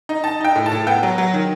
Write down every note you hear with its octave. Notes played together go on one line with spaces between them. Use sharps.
D#4
D#4 A5
D#4 G5
A2
A5
A2
B3 G5
F#3
F#3
D#3